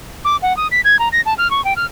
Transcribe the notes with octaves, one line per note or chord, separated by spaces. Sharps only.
D6
F#5
D#6
B6
G#6
A#5
A#6
A5
F6
C#6
G5
F6